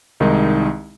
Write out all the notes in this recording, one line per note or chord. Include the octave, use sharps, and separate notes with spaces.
C2 D#3 G#3 D#4 D#5